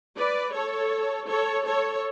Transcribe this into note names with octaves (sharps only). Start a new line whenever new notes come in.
B4 D5
A4 C#5
A4 C#5
A4 C#5